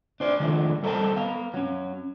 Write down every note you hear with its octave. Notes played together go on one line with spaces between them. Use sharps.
D4 C5 D5
D#3 F3 G#3 A3 D4
G3 A4 A#4 C5 D#5 A5
B3 F5
F#3 C#4